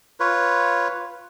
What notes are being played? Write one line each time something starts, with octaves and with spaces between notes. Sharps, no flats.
F4 B4 C#5